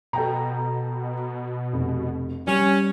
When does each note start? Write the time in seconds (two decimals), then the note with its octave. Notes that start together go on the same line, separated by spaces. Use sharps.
0.13 B2 A4 G5 A#5
1.73 F1
2.47 G3 C#4